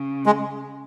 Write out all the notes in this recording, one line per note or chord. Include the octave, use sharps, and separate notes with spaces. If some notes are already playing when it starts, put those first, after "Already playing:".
Already playing: C#3
G#3